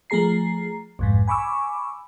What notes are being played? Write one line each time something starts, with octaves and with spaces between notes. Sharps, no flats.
F3 A3 G#4 A#5 C7
B1 F2 G#2
G#5 B5 C#6 D6 E6